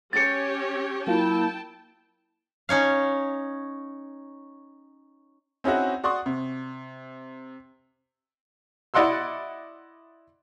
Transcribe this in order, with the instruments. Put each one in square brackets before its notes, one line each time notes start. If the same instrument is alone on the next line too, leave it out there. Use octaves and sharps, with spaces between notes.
[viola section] C#4 G4 C#5 [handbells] A6 C#7
[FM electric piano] F#3 A#3 F4 [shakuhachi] E4 [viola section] G5 A5
[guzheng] C#4 D#4 C#5 F5
[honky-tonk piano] C4 C#4 D#4 E4 F#4
F#4 D5 C6 C#6 D#6
C3
[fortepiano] E4 D5 D#5 F#5 C6 E6